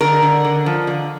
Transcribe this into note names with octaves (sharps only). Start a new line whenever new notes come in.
D3 A#4
D3
D3
F3
D3